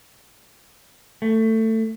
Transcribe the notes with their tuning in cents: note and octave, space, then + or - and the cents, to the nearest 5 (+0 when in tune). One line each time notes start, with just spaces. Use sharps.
A3 +20